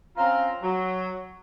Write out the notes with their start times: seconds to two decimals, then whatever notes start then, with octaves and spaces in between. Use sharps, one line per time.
0.17 C4 C#4 F4 F5 A#5
0.63 F#3